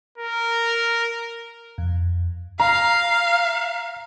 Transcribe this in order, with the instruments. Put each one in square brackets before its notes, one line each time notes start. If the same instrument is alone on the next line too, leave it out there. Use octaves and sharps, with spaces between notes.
[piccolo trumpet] A#4
[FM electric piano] F2
[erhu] F5 [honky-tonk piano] A#5